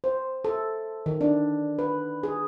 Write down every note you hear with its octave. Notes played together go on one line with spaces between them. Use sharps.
C5
A4
D#3
D4
B4
G#4